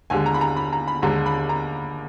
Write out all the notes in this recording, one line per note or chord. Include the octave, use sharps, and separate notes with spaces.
D#2 D3 G#3 G#5
A#5
B5
A#5
B5
A#5
B5
D#2 D3 G#3 A#5
B5
A#5